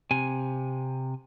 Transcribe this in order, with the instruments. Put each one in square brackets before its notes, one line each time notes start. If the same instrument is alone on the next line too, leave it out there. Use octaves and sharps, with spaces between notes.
[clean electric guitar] C3 G#5